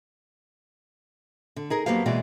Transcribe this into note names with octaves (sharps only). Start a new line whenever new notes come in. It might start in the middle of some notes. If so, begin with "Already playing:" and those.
D3
D#4 G#4 A#4
F2 F#3 A#3 B3 G4 F5
B2 E3 G#3 F#4 D5